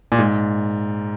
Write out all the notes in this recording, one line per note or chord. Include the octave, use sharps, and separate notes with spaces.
A#2
G#2